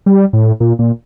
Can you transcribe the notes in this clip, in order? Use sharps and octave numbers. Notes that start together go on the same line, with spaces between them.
G3
A2
A#2
A#2